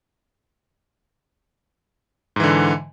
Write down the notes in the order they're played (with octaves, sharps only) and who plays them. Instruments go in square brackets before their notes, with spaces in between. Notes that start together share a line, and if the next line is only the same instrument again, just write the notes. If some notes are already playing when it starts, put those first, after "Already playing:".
[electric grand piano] G#2
E3
D3